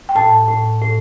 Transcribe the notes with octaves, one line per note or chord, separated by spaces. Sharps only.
G5
A2 A5
A2
A2